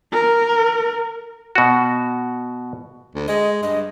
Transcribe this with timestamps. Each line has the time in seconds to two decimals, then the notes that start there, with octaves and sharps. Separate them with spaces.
0.12 A#4
1.55 B2 F#4
3.15 D2
3.28 G#3 D#5
3.63 G2 D#5